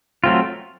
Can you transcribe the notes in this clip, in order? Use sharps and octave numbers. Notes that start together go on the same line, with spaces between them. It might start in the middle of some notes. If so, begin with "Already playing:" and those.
F#3 A3 C4 F4